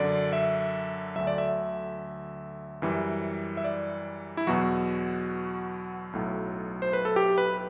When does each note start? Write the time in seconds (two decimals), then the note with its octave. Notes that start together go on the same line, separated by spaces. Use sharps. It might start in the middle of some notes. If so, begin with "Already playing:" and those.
Already playing: F#2 D3 F#3 D5
0.33 E5
1.16 D2 D3 F#3 E5
1.27 D5
1.38 E5
2.82 F#2 E3 G3
3.57 E5
3.64 D5
4.37 E4
4.47 E2 B2 F#3 F#4
6.13 B1 A2 F#3
6.82 C5
6.93 B4
7.05 A4
7.16 G4
7.38 B4